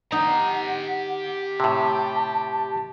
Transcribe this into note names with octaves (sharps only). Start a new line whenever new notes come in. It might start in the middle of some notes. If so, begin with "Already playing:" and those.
D#4 G4 F#5 A#5
A2 C3 A5